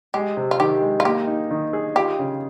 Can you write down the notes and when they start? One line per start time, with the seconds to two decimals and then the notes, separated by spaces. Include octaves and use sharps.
0.14 G#3 G4
0.37 C3
0.51 F4
0.60 D#3 G4
0.82 G#3
1.00 F4
1.05 A#3 G4
1.27 D#4
1.51 D#3
1.73 G#4
1.95 F4 G4
2.19 C#3